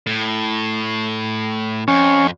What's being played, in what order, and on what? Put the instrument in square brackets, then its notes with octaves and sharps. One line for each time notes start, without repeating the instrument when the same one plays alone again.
[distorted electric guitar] A2
[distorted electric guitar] F2 [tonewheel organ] C#4